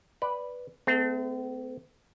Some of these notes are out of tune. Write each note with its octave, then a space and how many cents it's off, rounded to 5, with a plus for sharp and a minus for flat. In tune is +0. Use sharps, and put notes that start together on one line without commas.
B4 +0 D5 +0 G5 +0
A3 +0 C4 -40 G#4 +40